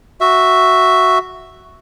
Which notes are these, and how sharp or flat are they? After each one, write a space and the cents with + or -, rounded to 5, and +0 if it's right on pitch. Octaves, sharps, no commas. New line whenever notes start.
F#4 +0 E5 +0